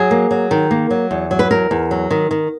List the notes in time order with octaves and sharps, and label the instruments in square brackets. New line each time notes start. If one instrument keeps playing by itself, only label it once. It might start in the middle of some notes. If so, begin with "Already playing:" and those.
Already playing: [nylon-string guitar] F#3 G#4
A#3
F#3
D#3
A#3
F#3
E2
F#3
B4
E2 A#4
E2
F#3
D#3
D#3